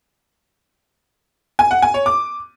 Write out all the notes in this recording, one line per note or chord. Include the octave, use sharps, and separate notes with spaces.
G#5
F#5
G#5
C#5
D6